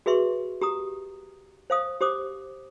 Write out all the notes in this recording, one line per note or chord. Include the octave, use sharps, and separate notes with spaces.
F#4 G#4 B4 E5 C6 C#6
G4 A#5 D#6
C5 F5 D#6
G4 C5 D6 D#6